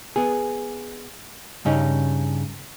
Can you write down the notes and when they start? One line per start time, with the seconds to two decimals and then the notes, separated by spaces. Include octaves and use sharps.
0.16 B3 G#4
1.65 G2 C#3 C#4 D#4